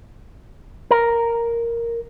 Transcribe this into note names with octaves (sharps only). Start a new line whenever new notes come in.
A#4